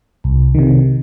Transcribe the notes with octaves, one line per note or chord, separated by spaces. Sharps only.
C2
C3 D#3